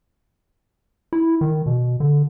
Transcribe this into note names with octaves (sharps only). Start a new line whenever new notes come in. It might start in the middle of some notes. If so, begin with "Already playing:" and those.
E4
D#3
B2
D3